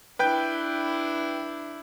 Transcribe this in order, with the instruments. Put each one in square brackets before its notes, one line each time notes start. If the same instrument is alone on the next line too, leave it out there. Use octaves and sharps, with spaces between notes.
[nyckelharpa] D4 E4 [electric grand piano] B4 G5 G6